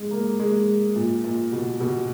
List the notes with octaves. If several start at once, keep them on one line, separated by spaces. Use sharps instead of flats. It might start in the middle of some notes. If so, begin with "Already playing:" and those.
Already playing: G#3
A#3
G#3
A#2
A#2
B2
B2